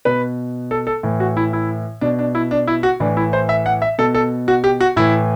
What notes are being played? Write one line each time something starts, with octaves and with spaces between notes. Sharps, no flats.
B2 B4
A4
A4
A2 E3
F#4
E4
E4
B2 D4
D4
E4
D4
E4
F#4
A2 E3 D4
E4
C5
E5
F#5
E5
B2 A4
A4
F#4
G4
F#4
A2 E3 E4